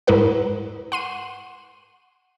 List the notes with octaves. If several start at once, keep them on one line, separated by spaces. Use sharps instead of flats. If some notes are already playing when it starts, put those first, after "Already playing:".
G#2 G#3 E4 A#4 B4 F#5
F#5 C6 D#7